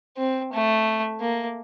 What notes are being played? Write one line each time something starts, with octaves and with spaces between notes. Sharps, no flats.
C4
A3
A#3